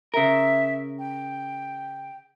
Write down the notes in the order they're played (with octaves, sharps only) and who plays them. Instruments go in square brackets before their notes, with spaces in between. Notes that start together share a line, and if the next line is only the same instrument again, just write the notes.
[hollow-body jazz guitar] C#3 A#4 [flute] E5
[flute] G5